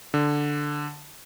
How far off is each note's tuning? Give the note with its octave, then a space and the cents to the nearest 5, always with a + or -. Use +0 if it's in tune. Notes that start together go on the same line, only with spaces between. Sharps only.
D3 +0